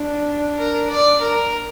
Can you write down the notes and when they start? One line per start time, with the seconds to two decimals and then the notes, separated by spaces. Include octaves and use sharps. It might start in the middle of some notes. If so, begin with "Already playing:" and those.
Already playing: D4
0.58 A#4
0.89 D5
1.21 A#4